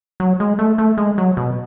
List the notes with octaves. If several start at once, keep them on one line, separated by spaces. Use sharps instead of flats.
F#3
G#3
A3
A3
G#3
F#3
B2